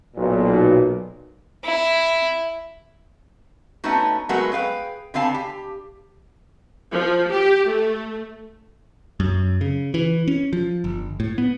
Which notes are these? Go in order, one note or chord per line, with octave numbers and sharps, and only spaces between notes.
B1 A#2
E4
A3 B3 C#4 D#4 F#4
F#3 G#3 A3 B3 F#4 A#4
G#4 B4 F5 G5
D3 B3 C4 F5 G#5 A5
G4
F3
G4
A3
F#2
C#3
E3
C#4
F3
G1
A2
B3